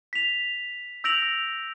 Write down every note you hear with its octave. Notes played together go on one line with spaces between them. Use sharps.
B6 F7
E6 G6 A#6 D7 F7 F#7